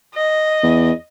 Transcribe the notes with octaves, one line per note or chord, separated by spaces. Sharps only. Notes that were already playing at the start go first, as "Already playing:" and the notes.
D#5
E2